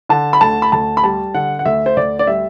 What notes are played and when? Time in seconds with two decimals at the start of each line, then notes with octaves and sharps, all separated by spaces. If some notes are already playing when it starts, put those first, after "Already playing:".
0.09 D3 A5
0.33 B5
0.41 D2 A5
0.62 B5
0.72 D2 A5
0.97 B5
1.04 G3 A5
1.35 D3 F#5
1.59 F#5
1.65 D2 E5
1.86 C5
1.97 D2 D5
2.19 D5
2.27 G3 E5